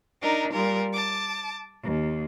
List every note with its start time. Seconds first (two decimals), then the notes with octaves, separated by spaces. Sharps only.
0.22 D4 D#4 A#4
0.53 A#2 G3 A#4
0.94 A5 D6
1.82 D#2